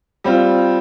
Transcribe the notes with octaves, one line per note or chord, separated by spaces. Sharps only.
G3 C4 F4